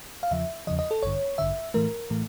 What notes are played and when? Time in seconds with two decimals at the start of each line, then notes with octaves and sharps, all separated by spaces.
0.23 F5
0.31 E2 C#3 F3 E5
0.67 E2 C#3 F3 D#5
0.79 D#5
0.91 A4
1.03 A1 G2 D3 C#5
1.38 A1 G2 D3 E5
1.74 A2 E3 A3 A#4
2.10 A2 E3 A3